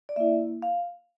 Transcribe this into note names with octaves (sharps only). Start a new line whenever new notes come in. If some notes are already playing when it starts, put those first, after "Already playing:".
D5
A#3 E4 E5
F5